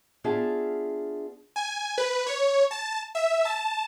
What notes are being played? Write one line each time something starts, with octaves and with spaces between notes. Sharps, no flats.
B3 D4 F4 G#4 E5 A5
G#5
B4
C#5
A5
E5
A5